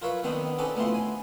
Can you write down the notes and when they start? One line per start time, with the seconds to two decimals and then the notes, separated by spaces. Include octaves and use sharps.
0.02 F4 A#4 B4 C#5 E5 F5
0.24 D#3 B3 C4 D4 D#4
0.59 C4 C#4 D#4 A4 B4 D5
0.75 D2 B3 E4 F4 C6
0.94 G#5